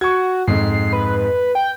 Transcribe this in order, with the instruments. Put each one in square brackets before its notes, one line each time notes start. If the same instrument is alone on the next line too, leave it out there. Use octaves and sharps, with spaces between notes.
[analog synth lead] F#4 [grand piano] C#6 G#6
[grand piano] F2 G#2 [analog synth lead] C7
[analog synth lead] B4
G5